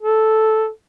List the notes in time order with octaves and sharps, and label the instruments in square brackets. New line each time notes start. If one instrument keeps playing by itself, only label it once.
[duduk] A4